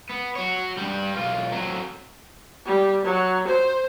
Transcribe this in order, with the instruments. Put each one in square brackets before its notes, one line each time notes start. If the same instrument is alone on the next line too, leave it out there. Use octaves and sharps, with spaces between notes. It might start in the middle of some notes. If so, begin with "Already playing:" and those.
[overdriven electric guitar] B3
F#4 C#5
G2 G3
B1 F4
F#3 C4
[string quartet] G3
F#3
C5